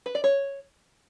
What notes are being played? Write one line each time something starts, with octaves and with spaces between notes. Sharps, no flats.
B4
D5
C#5